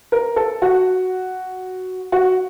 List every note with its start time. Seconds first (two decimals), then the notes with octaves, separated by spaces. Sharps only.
0.12 A#4
0.36 A4
0.62 F#4
2.12 F#4